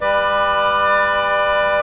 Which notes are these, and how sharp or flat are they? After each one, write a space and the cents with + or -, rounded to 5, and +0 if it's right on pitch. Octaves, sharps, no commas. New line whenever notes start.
G3 +35 B4 +0 D5 +25